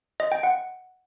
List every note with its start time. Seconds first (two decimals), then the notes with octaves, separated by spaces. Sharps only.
0.20 D#5
0.32 G5
0.43 F#5